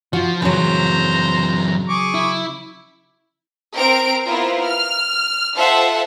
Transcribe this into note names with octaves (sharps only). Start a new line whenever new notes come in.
F3 F4 F#4
F#2 C#3 E3 F#3 C5 A#5
G#4 C#6 D6
E4
C4 A#4 A#5 D7
B3 E4 F4 A#4 C5
F6
F4 A4 C5 E5 F#5 A5